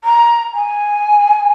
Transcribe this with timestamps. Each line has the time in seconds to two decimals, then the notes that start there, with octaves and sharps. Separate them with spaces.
0.04 A#5
0.54 G#5